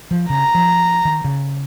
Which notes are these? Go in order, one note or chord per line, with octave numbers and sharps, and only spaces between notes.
F3
C#3 A#5
F3
D#3
C#3